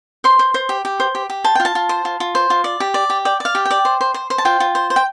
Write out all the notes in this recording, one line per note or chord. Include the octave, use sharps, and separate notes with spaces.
C5 C6
C5
C5
G4
G4
C5
G4
G4
C5 A5
G5
F4
A5
F4
C5
F4
F4
C5
F4
D5
G4
D5
G4
D5 G5
D5 F5
G4
G5
D5
C5
C5
C5
C5
A5
F4 G5
F4
C5
C5
G5